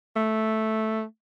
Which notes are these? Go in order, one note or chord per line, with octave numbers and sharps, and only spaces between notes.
A3